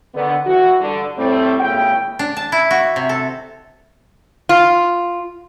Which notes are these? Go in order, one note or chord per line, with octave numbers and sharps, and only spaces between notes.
D3 D#3 B3
E3 F#4
G2 D3
A2 G3 A3 C4
G#1 A#2 C#3 E4 G5
D4
A5
E4
F#4
C3
A4
F4